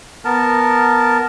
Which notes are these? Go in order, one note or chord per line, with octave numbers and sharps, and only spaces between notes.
B3 A#4 A5